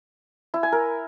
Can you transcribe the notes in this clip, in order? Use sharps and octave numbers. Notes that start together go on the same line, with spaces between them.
E4
G#5
A#4